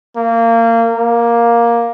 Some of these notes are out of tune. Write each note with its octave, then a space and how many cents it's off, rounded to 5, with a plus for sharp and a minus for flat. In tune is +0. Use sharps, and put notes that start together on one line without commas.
A#3 -25
A#3 +10